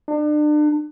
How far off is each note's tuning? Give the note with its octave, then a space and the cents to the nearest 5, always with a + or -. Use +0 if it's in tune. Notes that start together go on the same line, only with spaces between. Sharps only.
D4 +35